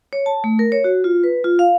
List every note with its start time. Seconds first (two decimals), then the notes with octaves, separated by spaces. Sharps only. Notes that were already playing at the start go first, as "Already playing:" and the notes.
0.13 C#5
0.26 A5
0.44 A3
0.59 A#4
0.72 C#5
0.84 F#4
1.04 F4
1.24 B4
1.44 F4
1.59 F5